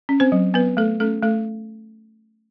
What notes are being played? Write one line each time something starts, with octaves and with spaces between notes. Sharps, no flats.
C#4
C4 C5
F#3
F#3 B3 B4
A3 A4
A3 C#4 A4
A3 A4